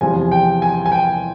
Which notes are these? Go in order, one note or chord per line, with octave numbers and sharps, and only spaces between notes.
E2 C3 F3 G#5
G5
G#5
G#5
G5